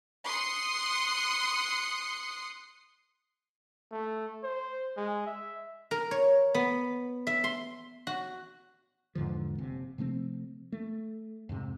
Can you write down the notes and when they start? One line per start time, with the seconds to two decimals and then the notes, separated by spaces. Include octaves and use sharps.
0.26 C6 D#6 F#6 C7 C#7
3.92 A3
4.44 C5
4.97 G#3
5.27 E5
5.91 A#4
6.11 C#5
6.54 B3
7.27 E5
7.44 C6
8.07 F#4
9.15 E2 G#2 D3 F3
9.58 F#1 C3
9.98 C3 F3 A3 C4
10.72 A3
11.49 F2 G#2 C3